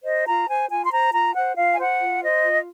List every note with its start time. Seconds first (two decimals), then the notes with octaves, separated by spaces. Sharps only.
0.04 C5 D#5
0.26 F4 A#5
0.48 C5 G#5
0.70 F4 G#5
0.85 C6
0.92 C5 A#5
1.13 F4 A#5
1.35 C5 F#5
1.57 F4 F5
1.71 G#5
1.79 C5 F#5
2.00 F4
2.22 C5 D#5
2.43 F4